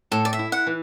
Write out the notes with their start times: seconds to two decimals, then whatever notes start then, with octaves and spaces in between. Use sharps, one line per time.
0.11 A2 A4
0.25 D5
0.33 E5
0.39 E4
0.52 F#5
0.67 E3